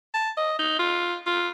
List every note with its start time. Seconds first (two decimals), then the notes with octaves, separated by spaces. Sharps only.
0.14 A5
0.37 D#5
0.59 D#4
0.79 F4
1.26 F4